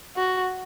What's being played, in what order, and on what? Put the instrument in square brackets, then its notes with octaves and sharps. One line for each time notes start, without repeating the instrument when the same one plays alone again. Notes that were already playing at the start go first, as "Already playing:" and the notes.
[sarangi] F#4